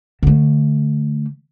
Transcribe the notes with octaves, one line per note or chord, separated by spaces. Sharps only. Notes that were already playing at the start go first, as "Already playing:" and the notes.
D3 A3